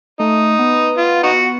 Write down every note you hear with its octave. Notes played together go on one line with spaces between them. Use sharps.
A3 D#4
B3
F4
D#4 F#4